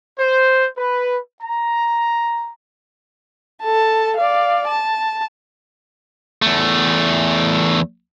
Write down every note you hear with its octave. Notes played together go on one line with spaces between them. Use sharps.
C5
B4
A#5
A4 A5
D5 F5
A5
E2 A3